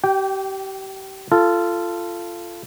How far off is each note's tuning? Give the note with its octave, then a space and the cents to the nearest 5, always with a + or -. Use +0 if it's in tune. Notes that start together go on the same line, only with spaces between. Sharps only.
G4 -30 G5 +0
F4 -20 A4 +0